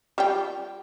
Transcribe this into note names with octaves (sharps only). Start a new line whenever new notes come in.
G3 F4 G5